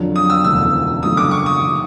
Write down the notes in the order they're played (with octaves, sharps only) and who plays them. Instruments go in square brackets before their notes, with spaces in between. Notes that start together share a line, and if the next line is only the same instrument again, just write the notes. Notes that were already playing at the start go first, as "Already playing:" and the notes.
Already playing: [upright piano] F2 D3 F#3
[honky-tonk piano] D#6
E6
[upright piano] E1 D2 C#3 [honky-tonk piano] E6
[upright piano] F#1 F#2 D3 F3 A3 [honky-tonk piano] D#6
[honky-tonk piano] D6
C#6
D#6
[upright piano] D#3